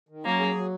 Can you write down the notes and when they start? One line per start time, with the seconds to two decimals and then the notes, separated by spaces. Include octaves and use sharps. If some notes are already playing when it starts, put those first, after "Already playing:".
0.09 D#3
0.24 F#3 A#3 C#4
0.39 G#4
0.55 F#3